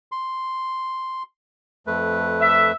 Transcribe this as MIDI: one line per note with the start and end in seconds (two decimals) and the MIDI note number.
0.12 1.23 84
1.87 2.72 41
1.87 2.72 57
1.87 2.72 71
2.41 2.74 76